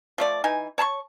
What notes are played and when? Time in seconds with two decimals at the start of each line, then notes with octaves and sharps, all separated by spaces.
0.18 F3 A3 D5
0.44 E3 D#4 G#5
0.78 C#5 A5 B5 C#6